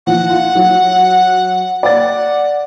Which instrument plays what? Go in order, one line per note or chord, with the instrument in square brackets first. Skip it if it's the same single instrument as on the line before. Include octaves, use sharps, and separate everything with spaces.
[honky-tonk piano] F3 [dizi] F#5
[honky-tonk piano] F4
F#3
[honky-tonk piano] D5 A6 [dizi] F#5